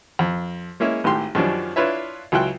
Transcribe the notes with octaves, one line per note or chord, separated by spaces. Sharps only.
F2
G#3 A#3 C#4 E4
G#1 A2 G4 C6
F#2 D#3 F3 G3 C#4 D4
D4 E4 F4 B4 C#5 E5
C#2 F#3 E4 F4 G5 F#6